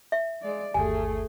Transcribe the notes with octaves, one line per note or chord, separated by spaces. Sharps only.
E5
G#3 D5
G1 D#2 A3 G4 G#4 G#5